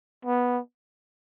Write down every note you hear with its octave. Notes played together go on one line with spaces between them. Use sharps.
B3